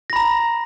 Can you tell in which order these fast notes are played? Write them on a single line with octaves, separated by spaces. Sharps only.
A#6 B5 A#5